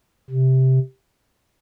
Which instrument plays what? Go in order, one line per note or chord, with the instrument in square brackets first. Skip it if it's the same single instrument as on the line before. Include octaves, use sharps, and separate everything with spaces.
[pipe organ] C3